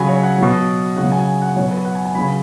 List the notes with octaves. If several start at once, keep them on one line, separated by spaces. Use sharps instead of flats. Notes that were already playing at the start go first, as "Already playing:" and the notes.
Already playing: C#3 F#3 G#5 B5
C#5
F#5
B2 F#3
C#3 F#3 F#5
G#5
F#5
B2 F#3 C#5
B4
F#5
G#5
G#5
C#3 F#3 B5